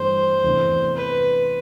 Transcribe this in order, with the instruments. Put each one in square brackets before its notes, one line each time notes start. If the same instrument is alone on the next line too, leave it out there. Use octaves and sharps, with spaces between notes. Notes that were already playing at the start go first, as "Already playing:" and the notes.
Already playing: [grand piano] G2 E3 A3 D4 [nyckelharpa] C5
[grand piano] E2 C3 E3 A3 D4
[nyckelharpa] B4